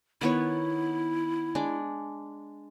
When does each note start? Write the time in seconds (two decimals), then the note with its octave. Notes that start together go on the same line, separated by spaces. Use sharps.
0.21 D#3 B3 E4 C#5
1.55 G#3 D4